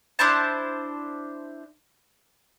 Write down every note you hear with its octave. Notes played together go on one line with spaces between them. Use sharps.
D4 E4 C5 A5